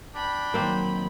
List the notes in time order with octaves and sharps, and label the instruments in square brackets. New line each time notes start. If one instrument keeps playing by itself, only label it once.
[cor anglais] D4 [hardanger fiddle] G5 B5
[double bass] D#3 F#3 [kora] A#3 C4